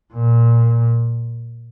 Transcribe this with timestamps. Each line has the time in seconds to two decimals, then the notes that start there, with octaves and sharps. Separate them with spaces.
0.13 A#2